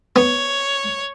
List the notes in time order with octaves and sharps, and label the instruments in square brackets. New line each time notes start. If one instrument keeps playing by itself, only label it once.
[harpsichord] B3 [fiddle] C#5